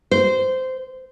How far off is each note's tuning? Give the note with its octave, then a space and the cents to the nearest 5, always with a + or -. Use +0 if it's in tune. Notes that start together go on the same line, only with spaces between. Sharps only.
C5 -15